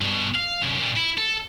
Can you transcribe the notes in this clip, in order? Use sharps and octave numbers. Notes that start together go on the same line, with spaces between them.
G2 B2
F5
C2 F#2
A#2 G3
E4
A4